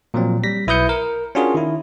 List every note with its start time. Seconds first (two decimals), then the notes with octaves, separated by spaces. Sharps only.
0.14 A#2 F3 F#3 C4
0.44 G3 A#6 B6
0.67 B1 E4 B4 D#6 G6 C#7
0.89 A#4
1.35 C#4 D4 F4 F#4 G#4 A#4
1.55 D#3 E4